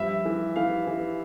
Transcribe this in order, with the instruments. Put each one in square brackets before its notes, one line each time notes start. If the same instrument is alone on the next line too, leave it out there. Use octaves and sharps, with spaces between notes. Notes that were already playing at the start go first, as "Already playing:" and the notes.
Already playing: [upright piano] G2 F3 E5
E3
E3 F5
E3